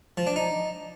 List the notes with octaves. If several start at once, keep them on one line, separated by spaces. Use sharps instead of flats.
F3
D4
D#4